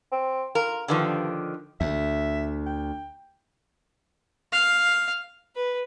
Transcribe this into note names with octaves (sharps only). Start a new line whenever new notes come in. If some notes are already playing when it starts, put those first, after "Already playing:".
C4
F4 A#4
G2 D3 D#3 F3
D2 E5
G5
F5
B4